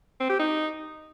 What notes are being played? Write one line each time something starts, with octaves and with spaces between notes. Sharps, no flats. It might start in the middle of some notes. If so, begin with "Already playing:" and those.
C4
G4
D#4